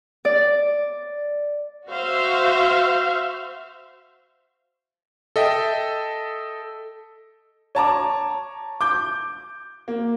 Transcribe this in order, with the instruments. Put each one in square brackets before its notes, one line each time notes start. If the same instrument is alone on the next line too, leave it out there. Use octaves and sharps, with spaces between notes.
[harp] D5
[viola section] F#4 C5 E5 F5
[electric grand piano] A4 D#5 E5 G5
[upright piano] C#5 A5 A#5 D6
D6 G6
A#3